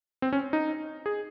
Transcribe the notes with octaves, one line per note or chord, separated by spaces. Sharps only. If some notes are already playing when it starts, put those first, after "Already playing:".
C4
C#4
D#4
G#4